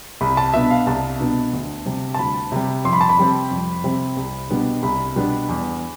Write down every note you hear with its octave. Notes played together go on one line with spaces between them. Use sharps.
C2 B5
A5
B2 B3 D4 E5
F5
C2 A5
B2 B3 D4
D2
C3 G3
A5
D2 B5
C3 G3
F2 C6
B5
A5
B5
C3 G3 C4
F2
C3 G3 C4
C2
B2 G3 B3 D4
C2 B5
B2 G3 B3 D4
E2